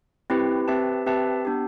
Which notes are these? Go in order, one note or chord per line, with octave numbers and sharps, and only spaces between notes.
C4 E4 G4 B4
C4 G4 B4 E5 A5
C4 G4 B4 E5 A5
B3 D4 G4